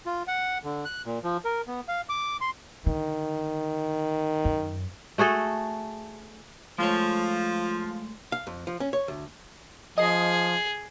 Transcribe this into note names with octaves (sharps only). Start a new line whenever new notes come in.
F4
F#5
D3
F#6
A#2
F3
A#4
B3
F5
D6
C6
D3 D#3
F#2
A3 F#4 G#4 A4
F3 G#3 A3 F4 C#5
F5
F2
F3
C#4
C#5
D2
F3 G#4 D#5